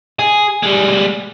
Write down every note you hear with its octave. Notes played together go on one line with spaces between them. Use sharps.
G#4
G3 G#3